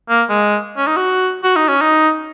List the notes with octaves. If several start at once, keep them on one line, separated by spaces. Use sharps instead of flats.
A#3
G#3
C#4
D#4
F#4
F#4
D#4
C#4
D#4